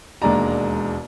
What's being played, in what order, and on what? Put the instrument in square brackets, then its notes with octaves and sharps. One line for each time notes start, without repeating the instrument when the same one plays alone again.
[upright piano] E1 D#2 G#3 D4 D5 A#5